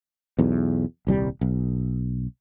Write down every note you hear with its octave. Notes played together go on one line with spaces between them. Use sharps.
B1 E2
D#1 C2 G3
B1